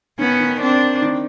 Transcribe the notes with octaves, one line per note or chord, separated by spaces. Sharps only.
D#3 B3 C#4
D#3
C4 D4
D#3